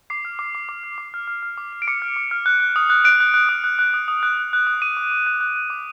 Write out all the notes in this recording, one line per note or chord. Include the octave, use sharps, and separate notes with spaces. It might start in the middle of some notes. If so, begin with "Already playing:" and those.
D6 C7
F6
D6
D6
D6
F6
D6
F6
F6
F6
D6
D6
D7
D6 C#7
F6
D6
F6
F#6
F#6
D#6
F#6
F#6 D7
F#6
F#6
D#6
F#6
F#6
D#6
D#6
F#6
F#6
F#6
D#6
D6 D#7
D6
D6
F#6
F#6
F#6
D6